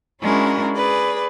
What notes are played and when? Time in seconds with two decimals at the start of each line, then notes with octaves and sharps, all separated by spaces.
0.21 G#3 C#4 D4 E4 F#4 A#4
0.75 G#4 B4 D5